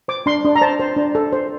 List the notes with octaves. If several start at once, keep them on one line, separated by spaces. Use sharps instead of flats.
C5 D6
D4 C6
D4
A#5
C5 A5
C5
D4
A4
C5